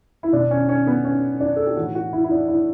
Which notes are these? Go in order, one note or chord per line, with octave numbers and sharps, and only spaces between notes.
E4
B2 D4
C#4
C#4
B3
C#4
D4
A4
G4
A2 E3 F#4
F#4
E4
E4
D4
E4